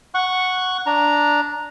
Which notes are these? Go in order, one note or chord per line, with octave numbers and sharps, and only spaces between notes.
F#5 C#6 F#6
D4 A#5